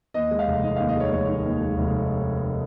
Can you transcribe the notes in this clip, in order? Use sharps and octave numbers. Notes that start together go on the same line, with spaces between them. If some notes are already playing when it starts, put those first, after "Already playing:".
D#2 D#5
G#3
F5
F1
D#3 D#5
D#2 F5
D#5
G#3 C#5
F1 C#5
D#3
D#2
G#3
F1